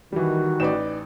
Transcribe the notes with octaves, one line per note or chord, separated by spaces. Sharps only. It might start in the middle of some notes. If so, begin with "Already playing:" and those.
D#3 E3 G3 F#4
A1 D#4 B4 D5 G5 E7